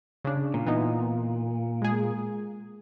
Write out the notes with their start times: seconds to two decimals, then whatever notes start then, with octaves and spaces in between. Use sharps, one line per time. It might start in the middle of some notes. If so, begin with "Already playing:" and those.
0.25 C#3 D4
0.54 A#2
0.66 E3 B3 D#4
1.82 G#3 G#4